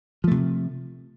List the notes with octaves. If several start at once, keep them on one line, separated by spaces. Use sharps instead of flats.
C3 F3 A3